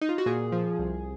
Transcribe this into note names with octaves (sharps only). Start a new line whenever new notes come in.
D#4
F4
F#4
A#2 G#4
F3
C2